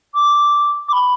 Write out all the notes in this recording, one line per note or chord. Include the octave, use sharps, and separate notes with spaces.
D6
D6
B5